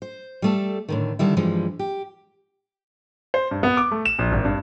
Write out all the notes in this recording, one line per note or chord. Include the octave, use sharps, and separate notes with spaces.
C5
G3 A3 A4
A2 D3 D#3
D3 D#3 G3 E4
G2 E3 F3 G3 G#3
G4
C5
G2
B3
D6
A3
E7
A#1
G#1
G2